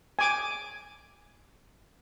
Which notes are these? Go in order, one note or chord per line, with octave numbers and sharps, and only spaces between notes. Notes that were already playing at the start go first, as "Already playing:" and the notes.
G#5 D6